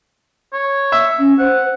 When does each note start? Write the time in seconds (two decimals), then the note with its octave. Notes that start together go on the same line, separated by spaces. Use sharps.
0.53 C#5
0.92 E5
1.19 C#4
1.39 C5 F#5